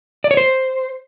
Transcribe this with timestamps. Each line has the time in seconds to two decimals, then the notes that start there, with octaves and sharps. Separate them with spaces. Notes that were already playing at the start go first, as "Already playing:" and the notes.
0.24 D5
0.31 C#5
0.37 C5